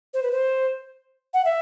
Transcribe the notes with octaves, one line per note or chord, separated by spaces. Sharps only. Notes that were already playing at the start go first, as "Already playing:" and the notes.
C5
B4
C5
F#5
E5